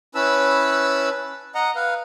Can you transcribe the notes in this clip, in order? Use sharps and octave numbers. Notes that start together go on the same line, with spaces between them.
C#4 E4 B4 A5 B5 E6
D#5 F#5 A#5
B4 F5